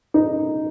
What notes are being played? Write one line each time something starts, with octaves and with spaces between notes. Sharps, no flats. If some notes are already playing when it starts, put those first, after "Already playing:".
D#4